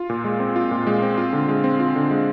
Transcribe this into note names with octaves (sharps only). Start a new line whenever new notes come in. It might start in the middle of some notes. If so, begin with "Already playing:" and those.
Already playing: F4
A#2
G#3
C4
F4
A#2
G#3
C4
F4
D3
G#3
C4
F4
D3
G#3